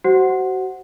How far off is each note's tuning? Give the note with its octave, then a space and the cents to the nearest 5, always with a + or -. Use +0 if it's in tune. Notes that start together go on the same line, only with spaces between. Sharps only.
F#4 +30 C5 +0 F#5 +0